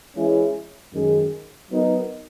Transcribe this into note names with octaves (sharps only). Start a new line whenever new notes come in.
E3 G#3 C#4 E4 G#4
F#2 D#3 G#3 C#4 G#4
F#3 B3 D#4 A#4